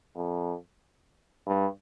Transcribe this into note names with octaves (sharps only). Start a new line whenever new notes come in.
F2
G2